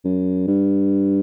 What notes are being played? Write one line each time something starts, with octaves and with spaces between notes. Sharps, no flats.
F#2
G2